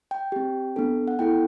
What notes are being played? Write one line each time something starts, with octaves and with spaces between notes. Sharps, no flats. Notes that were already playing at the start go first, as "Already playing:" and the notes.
G5
C4 G4
B3 D4 A4
F#5
B3 E4 A4 G5